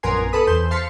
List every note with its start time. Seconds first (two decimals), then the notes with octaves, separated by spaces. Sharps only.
0.03 A#1 F#2 B3 A#4 G#5 C6
0.33 A4 B4 B5 D#6
0.47 E2 C5 G6
0.71 F5 A5 C6 F6 B6 C#7